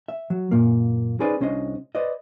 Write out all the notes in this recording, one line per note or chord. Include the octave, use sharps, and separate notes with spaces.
E5
F#3
F#2 A#2 A#3
C#4 D#4 G#4 B4 C5 D5
C2 C#4 D4 C5 D#5
B4 C5 D5 D#5